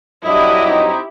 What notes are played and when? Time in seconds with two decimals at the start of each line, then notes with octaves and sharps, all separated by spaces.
0.25 G2 F#3 D4 E4 G4 D#5 D#6
0.67 C4 D#4